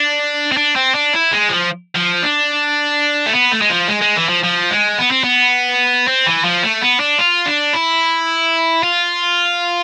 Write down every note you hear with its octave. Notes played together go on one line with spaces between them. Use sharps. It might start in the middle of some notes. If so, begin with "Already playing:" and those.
Already playing: D4
C4
D4
C4
D4
E4
G#3
F3
F3
D4
A3
B3
A3
G#3
F3
G#3
G#3
E3
F3
F3
G#3
B3
C4
B3
C4
E3
F3
A3
B3
D4
F4
D4
E4
F4